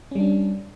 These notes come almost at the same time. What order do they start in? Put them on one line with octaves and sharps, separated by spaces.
C#4 G3 D4